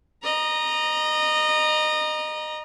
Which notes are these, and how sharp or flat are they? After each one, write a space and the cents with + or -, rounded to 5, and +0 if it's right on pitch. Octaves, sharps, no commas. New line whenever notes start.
D#5 -25 A#5 +20